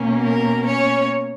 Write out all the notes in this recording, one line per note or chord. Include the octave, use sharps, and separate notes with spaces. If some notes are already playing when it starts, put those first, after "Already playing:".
Already playing: B2 A#3 C#4
A#4
C#4 C#5